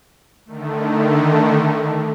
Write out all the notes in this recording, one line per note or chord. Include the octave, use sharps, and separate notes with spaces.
D3 D#3 A3